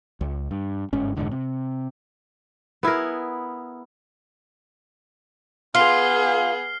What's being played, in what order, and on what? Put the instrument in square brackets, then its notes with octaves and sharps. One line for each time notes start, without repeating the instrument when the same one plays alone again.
[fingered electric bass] C#2
G2
G1 G#2 C#4
F1 B1 G#2 D3
C3
[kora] B3 E4 G#4 A#4
[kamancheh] B3 G#4 [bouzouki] F4 [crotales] F6 C7 G7